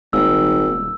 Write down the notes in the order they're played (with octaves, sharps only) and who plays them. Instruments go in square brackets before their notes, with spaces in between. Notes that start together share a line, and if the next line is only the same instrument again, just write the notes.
[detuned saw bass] D#1 [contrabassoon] G#1 [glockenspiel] E6